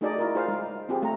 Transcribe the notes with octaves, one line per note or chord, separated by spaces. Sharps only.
A3 D#4 F#4 G#4 D5 D#5
E4 F4 A#4
F4 G#4 A#4 C5 F5
G#3
C4 F4 G4 G#4
A3 A#5